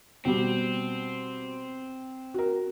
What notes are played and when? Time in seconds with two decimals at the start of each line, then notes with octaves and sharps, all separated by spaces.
0.25 B2 G3 C4
2.34 F#4 A#4